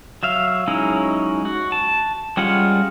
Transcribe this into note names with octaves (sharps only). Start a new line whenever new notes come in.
F#3 E5 F5
F#3 G#3 C#4 D#4 E4
F#4
A5
G3 G#3 C#4 F4 F#5